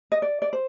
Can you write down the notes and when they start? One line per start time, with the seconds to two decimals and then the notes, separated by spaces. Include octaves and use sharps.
0.12 D#5
0.22 D5
0.42 D5
0.53 C5